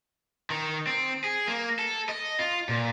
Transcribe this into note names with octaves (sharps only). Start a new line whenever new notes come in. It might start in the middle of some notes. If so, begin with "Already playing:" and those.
D#3
C4
G#4
A#3
A4
D#5
F4
A#2